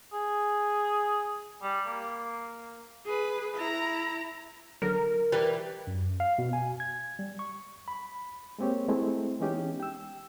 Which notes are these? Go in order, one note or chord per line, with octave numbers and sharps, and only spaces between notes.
G#4
G3
A#3
G#4 B4
E4 A#5
D3 F#3 A#4
E3 G3 B4
F#2
F5
B2
G#5
G#6
G3
C#6
B5
G#3 A#3 C4 G4 C#5
G#3 A3 C4 E4
E3 G#3 B3 C#4 D#4 G4
G5 E6